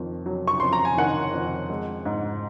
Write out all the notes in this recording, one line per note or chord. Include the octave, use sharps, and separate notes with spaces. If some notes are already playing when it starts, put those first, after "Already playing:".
Already playing: F2 D#3
F#3
C#6
F2 C6
A#5
G#5
D#3 F#5
F2
G#3
G#2